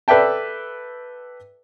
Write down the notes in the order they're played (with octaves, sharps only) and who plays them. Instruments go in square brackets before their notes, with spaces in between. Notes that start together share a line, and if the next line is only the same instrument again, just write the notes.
[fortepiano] A4 B4 D5 E5 G5 A5